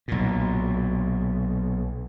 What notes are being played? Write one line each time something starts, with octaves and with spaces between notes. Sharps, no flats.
B1 A#2